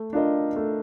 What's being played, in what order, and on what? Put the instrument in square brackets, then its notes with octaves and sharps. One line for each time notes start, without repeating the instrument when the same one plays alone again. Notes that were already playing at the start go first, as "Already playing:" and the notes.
Already playing: [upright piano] A3
D4 F4 A#4 D#5
A3